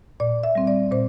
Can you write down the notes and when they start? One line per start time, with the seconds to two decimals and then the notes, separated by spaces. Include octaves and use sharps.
0.20 A#2 D5
0.43 E5
0.55 G3 C4
0.67 D5
0.91 A#2 C5